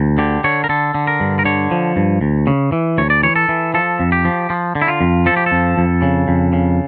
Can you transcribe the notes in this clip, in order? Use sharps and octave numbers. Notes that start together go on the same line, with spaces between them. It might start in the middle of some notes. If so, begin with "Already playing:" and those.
Already playing: D2
D3 G4
D3 C#5
A#4
D3 A4
D3
A#4
G2
A#4
D3 C#5
F3
G2
D2
C#3
E3
D2 C#5
D5
E3 C#5
A4
E3
F3 A4
F2
G4
F3
F3
D3
E4
F4
F2
F3 A4
G4
A4
F2
F2
C#3
F2
C#3